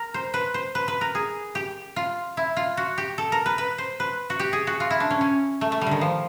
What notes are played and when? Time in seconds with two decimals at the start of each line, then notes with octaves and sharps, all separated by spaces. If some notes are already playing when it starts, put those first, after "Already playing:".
Already playing: A#4
0.14 C5
0.34 B4
0.54 C5
0.75 B4
0.88 B4
1.01 A#4
1.15 G#4
1.55 G4
1.96 F4
2.37 E4
2.57 F4
2.77 F#4
2.98 G4
3.18 A4
3.32 A#4
3.46 B4
3.58 B4
3.78 C5
4.00 B4
4.30 F#4
4.39 G4
4.53 G#4
4.67 F#4
4.80 F4
4.90 E4
5.00 D4
5.10 C#4
5.21 C#4
5.61 A3
5.72 A3
5.81 G3
5.87 D3 D#3
6.01 F3